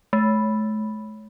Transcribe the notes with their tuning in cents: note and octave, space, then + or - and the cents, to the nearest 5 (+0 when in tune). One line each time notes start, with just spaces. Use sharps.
A3 -40